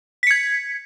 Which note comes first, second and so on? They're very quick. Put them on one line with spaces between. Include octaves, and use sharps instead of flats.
B6 C#7 G#6